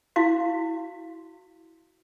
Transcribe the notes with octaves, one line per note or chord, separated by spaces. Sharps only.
E4 F#4 F5